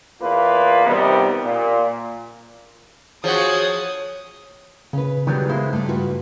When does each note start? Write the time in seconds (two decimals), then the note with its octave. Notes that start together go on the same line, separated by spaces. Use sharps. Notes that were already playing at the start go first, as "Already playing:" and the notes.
0.21 E2 A#3 F4 B4
0.87 C3 D#3 G3 B3
1.46 A#2
3.24 F3 F#4 G#4 C#5 D#6
4.93 C#3 C#4 B4
5.27 D#3 F#3 G3 B3 G4 G#4
5.49 G#3 A#3 E4 C5
5.73 G2 A3 D4
5.88 F4 F#4 B4